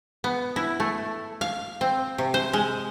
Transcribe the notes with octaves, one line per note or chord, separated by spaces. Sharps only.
B3
E4
A3
F5
C4
C3
C5
G#3